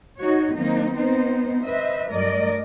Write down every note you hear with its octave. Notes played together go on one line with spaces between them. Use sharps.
D#4 F#4 C#5
D#3 F#3 A#3 C4 D#4
B3 C4 D#4 C5
B4 C5 D#5 E5
G2 F#3 A3 A#4 D5 D#5